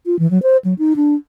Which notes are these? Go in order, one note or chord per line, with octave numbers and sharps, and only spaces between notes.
F4
E3
F#3
C5
F#3
D#4
D4